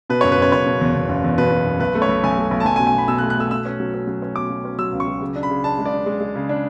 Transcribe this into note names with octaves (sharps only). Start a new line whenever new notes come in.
B2 B4
F#1 C#5
B4
F#1 C#5
F#1 C#5
B2
E2
E2
F#1
E2
B2 B4
B2
F#1
B1 B4
A3
C#5
B1
B1 G#5
A3
B1
A5
B1 G#5
G#5
B2
G#5
B1 B5
B2 E6
F#6
A3
F#6
A3 E6
B2 E6
C#4
F#3
C#4
F#3
C#4
B2 D6
F#3
C#4
F#3 E6
C#2
C#6
F#3
C#3
D4
B5
C#3
D4 A5
G#3
D5
D4
G#3
G#3
C#3
D4